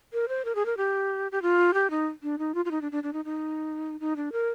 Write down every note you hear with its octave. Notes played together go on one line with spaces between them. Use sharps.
A#4
C5
A#4
G#4
A#4
G4
G4
F4
G4
D#4
D4
D#4
F4
F4
D#4
D4
D4
D4
D#4
D#4
D#4
D4
A#4